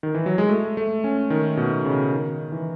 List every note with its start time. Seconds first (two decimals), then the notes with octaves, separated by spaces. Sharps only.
0.03 D#3
0.14 E3
0.26 F#3
0.38 G#3
0.49 A3
0.77 A3
1.04 C#4
1.30 D#3
1.57 B2
1.85 C#3
2.12 D#3
2.52 E3